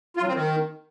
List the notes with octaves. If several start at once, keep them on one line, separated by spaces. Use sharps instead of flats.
F4
F#3
C4
D#3